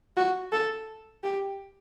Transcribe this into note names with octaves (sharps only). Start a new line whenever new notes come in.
F#4
A4
G4